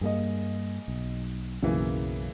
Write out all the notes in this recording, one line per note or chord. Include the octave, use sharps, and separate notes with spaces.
G2 A#3 G#4 D#5
B1
B1 F#2 C#3 E3 A#3